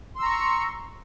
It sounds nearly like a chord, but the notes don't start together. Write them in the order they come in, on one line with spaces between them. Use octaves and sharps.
C6 E6 A#5 C#6